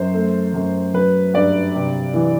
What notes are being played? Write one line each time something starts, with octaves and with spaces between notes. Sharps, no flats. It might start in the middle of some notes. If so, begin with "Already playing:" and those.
Already playing: F#2 C5
A3
F#2
F#3 B4
G2 D5
C3
E3